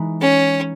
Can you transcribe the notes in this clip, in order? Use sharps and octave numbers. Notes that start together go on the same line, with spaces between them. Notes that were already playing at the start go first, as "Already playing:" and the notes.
Already playing: E3 G#3 D#4 B4
C#4